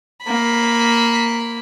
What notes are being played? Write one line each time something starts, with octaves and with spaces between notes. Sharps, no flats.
A#3 B5